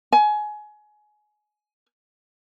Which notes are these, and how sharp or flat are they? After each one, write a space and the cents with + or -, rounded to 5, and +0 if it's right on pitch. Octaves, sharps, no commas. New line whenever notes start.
G#5 +25